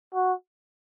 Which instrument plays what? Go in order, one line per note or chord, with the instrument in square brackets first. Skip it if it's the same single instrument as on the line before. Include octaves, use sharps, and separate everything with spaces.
[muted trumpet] F#4